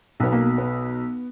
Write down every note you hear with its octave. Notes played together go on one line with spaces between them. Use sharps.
B1 B2 B3
A#3
B3